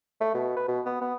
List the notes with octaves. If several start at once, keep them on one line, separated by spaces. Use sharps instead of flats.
A3
B2
B4
B2
B3
B3